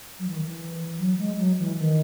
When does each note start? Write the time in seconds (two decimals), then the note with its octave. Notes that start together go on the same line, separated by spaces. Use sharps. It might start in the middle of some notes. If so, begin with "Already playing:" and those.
0.19 F#3
0.28 E3
0.36 D#3
0.45 E3
0.99 F#3
1.18 G#3
1.38 F#3
1.59 E3
1.78 D#3